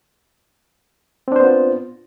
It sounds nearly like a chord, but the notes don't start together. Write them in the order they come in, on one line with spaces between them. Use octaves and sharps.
C4 D4 C5 B3 F4